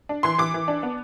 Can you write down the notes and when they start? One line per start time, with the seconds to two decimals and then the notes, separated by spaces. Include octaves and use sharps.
0.09 D4
0.23 E3 C6
0.38 E3 D6
0.54 E3
0.68 D4
0.83 B3